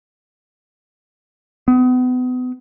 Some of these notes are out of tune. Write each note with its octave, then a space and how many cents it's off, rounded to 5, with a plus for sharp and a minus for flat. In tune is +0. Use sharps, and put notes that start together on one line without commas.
B3 +35